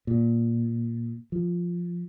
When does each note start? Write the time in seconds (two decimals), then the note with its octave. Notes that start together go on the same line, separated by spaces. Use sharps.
0.07 A#2
1.32 F3